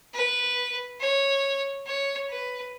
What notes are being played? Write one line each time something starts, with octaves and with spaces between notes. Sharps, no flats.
B4
C#5
C#5
B4